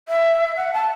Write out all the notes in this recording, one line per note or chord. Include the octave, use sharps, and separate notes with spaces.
E5
F#5
A5